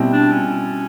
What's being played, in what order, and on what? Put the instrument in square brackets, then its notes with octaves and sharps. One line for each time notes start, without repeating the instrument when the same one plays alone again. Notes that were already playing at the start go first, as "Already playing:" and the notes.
Already playing: [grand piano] B2 G3 C4 E4
[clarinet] D4
C#4